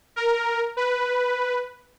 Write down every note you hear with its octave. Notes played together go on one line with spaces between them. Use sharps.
A#4
B4